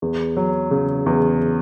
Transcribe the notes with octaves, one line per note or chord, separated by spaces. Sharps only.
E2
F#3
C#3
E2